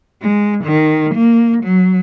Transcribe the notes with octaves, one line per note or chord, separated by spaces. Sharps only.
G#3
D#3
A#3
F#3